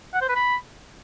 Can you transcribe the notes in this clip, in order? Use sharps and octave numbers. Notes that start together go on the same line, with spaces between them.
F#5
C5
B4
B5